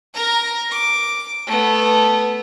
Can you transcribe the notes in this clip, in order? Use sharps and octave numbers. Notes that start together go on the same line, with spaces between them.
A#4 A#5
D6
A3 B3